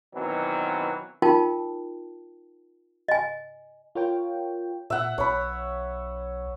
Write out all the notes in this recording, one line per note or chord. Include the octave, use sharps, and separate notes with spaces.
B2 D#3 E3 F#3 C4
D#4 F4 A#4 G5 A5
D#5 G#5
F4 A#4 C#5 G5
A#2 E5 F#5
B1 C#5 B5